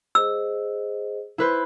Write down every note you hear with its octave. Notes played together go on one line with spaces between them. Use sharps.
G#4 C5 D#5 E6
E4 B4 C5